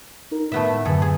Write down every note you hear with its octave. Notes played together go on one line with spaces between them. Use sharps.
D#4 A#4
A2 A3 B3 E5
F#2 D3 G#4 A4 B4
G#4